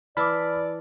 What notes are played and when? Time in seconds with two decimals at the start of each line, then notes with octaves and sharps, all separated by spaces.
0.17 E3 E4 D5 A5 B5 D6 E6 F6